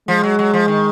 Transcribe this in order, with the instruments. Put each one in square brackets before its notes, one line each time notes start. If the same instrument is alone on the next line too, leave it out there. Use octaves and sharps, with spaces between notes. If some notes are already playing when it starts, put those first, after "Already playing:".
[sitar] F3 [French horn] G#3
[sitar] F#3
F#3
F3
D#3